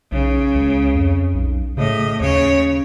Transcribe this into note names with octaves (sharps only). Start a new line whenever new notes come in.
B1 C#3
C#2
F2
B1
A2 C#3 D#5
D#2 C#3 C#5